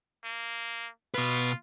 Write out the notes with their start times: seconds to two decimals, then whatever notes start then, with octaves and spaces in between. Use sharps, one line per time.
0.25 A#3
1.14 B2 F4 B4